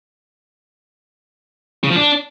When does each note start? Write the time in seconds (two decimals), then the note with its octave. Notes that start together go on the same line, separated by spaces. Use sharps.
1.84 C#3
1.90 F3
1.96 D4